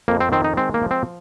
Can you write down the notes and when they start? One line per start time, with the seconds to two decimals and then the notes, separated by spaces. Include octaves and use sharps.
0.08 F2 A#3
0.20 C4
0.32 D#3 C4
0.44 D#4
0.57 G#3 C4
0.74 A#3
0.83 F3
0.91 C4